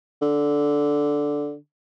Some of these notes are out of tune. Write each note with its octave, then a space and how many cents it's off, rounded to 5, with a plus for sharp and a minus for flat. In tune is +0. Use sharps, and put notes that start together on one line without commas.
D3 -5